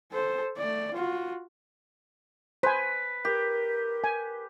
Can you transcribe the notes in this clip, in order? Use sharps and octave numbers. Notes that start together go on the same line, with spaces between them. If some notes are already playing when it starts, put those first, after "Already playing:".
A4 C5
A3 D5
F4 F#4
B4 C5 G#5
G4 A#4
G#5